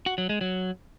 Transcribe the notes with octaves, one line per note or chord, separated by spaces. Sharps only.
F#4
F#3
G#3
F#3